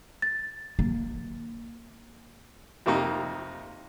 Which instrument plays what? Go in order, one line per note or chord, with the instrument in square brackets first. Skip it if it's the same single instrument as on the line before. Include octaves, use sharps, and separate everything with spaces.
[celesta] A6
[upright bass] A#3
[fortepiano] F2 C3 A#3 D#4